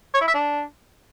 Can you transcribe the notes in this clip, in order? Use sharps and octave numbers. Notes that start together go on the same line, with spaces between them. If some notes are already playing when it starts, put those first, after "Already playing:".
C#5
E4
E5
D4